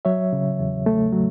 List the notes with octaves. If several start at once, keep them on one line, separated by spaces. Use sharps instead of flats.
F#3 C#5 E5
C#3
E2
A3
F#3